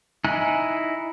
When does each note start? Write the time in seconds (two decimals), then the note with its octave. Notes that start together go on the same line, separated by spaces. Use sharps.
0.24 D#4 E4 G#5 F#6